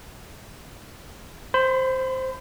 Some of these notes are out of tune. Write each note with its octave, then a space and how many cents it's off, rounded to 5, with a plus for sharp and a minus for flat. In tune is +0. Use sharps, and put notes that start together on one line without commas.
C5 +0 B5 +40